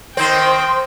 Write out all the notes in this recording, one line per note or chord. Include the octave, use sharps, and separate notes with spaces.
D#3 C4 C5 G5